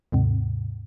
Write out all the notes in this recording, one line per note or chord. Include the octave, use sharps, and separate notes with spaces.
D#2 G#2 C3